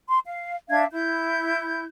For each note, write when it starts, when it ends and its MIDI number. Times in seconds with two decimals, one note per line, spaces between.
0.08 0.18 84
0.25 0.56 77
0.69 0.84 62
0.69 0.84 76
0.69 0.84 77
0.69 0.84 92
0.92 1.85 64
0.92 1.85 91